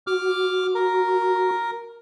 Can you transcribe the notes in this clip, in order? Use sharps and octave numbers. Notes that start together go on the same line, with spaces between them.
F#4 D6 F6
A#4